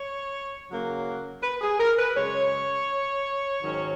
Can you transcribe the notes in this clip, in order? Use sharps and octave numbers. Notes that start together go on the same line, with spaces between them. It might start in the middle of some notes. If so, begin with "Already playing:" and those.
Already playing: C#5
C#3 F#3 A#3 C#4
B4
G#4
A#4
B4
F#2 C#3 G#3 C#4 C#5
G#2 D#3 F#3 C#4